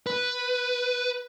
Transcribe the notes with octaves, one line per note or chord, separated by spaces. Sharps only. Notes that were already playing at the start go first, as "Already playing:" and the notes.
B4